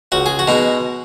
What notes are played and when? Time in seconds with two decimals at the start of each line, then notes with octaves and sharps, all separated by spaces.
0.12 C#2 F#4
0.26 G#4
0.39 F#4
0.47 B2 G#3 D#4